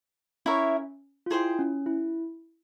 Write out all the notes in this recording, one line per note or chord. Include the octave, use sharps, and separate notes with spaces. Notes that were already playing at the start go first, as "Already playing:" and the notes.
C#4 E4 A#4 C#5 E5
F4
E4 G#4 C5 G5
C#4
E4